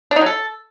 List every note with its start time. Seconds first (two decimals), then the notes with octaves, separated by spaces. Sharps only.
0.11 D4
0.16 D#4
0.21 F#3
0.26 A4